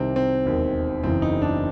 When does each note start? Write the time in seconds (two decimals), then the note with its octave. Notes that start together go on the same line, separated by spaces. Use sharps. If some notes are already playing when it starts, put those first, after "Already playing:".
Already playing: C2 C3 D#3 C4
0.16 C4
0.45 E1 D#2 D#3
1.03 F#1 E2 C#3 E3 C4
1.22 D#4
1.42 D4